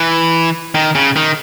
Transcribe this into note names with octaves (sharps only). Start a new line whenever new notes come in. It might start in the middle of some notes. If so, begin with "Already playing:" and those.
Already playing: E3
D#3
C#3
D#3